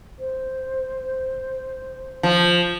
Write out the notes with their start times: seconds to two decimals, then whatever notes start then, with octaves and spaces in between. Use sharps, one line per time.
0.19 C5
2.23 F3